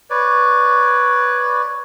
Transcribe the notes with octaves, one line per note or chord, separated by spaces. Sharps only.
B4 C#5 D5